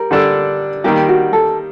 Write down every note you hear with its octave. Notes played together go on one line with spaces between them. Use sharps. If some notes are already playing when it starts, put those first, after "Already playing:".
Already playing: G3 A#4
D3 G3 D4 A4
D#3 G3 A#3 G4
F#4
A4